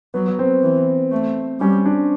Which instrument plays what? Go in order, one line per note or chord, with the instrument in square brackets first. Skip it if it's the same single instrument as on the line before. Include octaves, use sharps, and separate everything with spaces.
[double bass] F#3 [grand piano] B3
[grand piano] C4
[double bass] E3
A3
[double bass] G3 [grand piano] C#4
[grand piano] D4